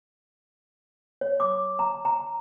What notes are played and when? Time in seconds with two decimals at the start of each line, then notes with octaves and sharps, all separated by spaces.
1.21 C#5
1.40 D6
1.79 A#5
2.05 A#5